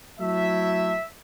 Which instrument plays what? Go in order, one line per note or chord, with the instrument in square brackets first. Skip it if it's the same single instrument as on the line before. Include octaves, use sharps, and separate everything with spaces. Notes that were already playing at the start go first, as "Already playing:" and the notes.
[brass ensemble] F#3 A3 E4 E5